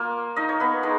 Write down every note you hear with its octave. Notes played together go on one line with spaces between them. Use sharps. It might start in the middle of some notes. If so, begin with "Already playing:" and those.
Already playing: A#3 F4
D#4 D#5
C#5
B3 B4
G#3 D#4